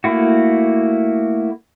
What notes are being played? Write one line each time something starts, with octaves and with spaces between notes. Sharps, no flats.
A3 A#3 E4 F#4